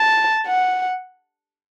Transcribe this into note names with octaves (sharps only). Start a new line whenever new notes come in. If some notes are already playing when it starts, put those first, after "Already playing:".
Already playing: A5
F#5